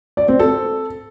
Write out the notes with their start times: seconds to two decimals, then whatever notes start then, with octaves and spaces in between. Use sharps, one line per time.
0.17 D5
0.28 C4
0.39 A4